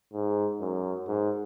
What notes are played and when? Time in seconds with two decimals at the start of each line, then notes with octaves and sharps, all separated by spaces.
0.14 G#2
0.61 F#2
1.08 G#2